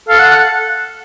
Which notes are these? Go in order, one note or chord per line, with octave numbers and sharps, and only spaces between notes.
A4 F5
F#5
F#5